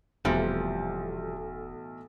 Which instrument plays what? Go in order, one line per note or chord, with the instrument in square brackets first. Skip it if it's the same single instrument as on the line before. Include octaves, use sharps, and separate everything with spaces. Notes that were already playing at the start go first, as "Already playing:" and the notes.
[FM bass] E1 [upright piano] B1 A2 E3 [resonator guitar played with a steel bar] C3 F3 G3